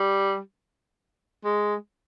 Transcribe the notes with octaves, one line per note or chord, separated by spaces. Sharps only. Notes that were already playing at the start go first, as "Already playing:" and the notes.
Already playing: G3
G#3